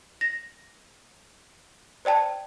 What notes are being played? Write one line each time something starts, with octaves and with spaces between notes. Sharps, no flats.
A#6
C5 D5 G5 A5